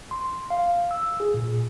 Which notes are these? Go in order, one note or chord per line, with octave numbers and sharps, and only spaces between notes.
C6
F5
E6
G#4
A#2